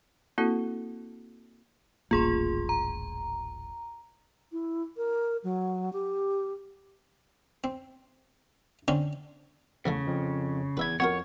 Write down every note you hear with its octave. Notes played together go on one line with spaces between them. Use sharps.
A#3 C4 E4 F#4 A4
D#1 A1 A#3 F4 G#4 C6
A#5
E4
A#4
F#3
G4
C4
D3 C4 C#4
A1 E2 C#3 A3
F2
E2 B4 E5 B5 G#6
F2 B3 F#4 A#4 C#5